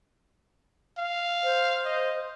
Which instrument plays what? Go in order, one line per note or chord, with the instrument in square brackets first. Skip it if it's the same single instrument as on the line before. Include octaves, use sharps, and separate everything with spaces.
[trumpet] F5
[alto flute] C5
[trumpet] D#5